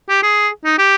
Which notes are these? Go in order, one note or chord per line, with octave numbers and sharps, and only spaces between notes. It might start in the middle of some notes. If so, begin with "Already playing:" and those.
G4
G#4
D#4
G4